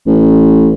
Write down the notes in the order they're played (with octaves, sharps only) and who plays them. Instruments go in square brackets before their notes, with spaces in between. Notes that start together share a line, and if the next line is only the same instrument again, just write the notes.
[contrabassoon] A1